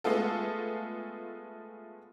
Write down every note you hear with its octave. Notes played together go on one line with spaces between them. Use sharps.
G#3 A3 B3 F4 A4